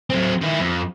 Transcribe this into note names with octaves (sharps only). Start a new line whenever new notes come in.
F#3 C4
D#3 E4
F2